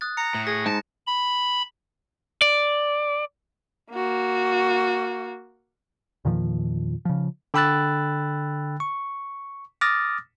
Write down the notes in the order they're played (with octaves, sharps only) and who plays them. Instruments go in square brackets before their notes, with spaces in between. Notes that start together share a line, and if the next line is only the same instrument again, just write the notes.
[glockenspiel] D#6 F#6 A6
[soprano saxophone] A#5 [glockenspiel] C#7
[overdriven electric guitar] A2
[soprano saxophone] G#4 [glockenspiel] A#6
[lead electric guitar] G#2 [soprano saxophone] A5
[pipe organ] B5
[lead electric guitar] D5
[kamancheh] A#3 F#4
[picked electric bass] E2 A#2 D#3 F3
C#3 F3
[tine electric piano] D3 G5 B5 E6 F#6 A6
C#6
D6 D#6 F6 A6 A#6